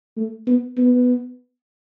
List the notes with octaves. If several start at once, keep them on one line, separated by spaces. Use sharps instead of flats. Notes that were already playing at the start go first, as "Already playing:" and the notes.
A3
B3
B3